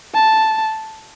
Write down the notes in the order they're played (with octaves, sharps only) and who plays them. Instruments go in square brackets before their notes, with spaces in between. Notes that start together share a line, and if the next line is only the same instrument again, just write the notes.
[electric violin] A5